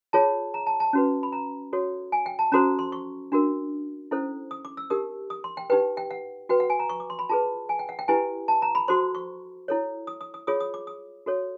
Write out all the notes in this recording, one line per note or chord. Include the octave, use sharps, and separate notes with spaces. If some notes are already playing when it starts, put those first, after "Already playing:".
F4 G#4 C#5 A5
A#5
A5
A5
C#4 F#4 B4
B5
A#5
F#4 A4 C#5
G#5
G5
A5
C#4 F#4 A4 C5 A#5
C6
C#6
D4 F#4 A#4
C#4 E4 A4 C5
D#6
D6
E6
D#4 G4 A#4 D#6
D#6
C6
G5
D#4 G4 B4 G5
G5
F#5
F#4 B4 G5
F#5
G#5
A#5
C#6
D6
C6
B5
F4 G#4 B4 A5
G#5
G5
F#5
G5
E4 G4 B4 G#5
A5
A#5
B5
F#4 A4 C5 C6
C#6
E4 A4 C#5
D#6
D#6
D#6
F4 G#4 C#5 D#6
D#6
D6
D#6
F#4 A4 C#5